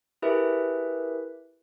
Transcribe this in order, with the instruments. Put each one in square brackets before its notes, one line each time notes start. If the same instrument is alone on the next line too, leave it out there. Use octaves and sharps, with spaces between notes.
[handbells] E4 G4 G#4 A#4 B4 E5